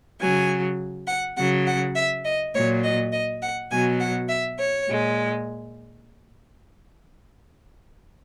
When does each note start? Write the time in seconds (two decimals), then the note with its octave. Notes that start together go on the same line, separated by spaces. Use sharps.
0.21 C#3 F#3 G#5
1.07 F#5
1.37 C#3 F#3 F#5
1.67 F#5
1.96 E5
2.25 D#5
2.54 A#2 F#3 C#5
2.84 D#5
3.12 D#5
3.42 F#5
3.71 B2 F#3 G#5
4.00 F#5
4.29 E5
4.59 C#5
4.88 A#2 G#3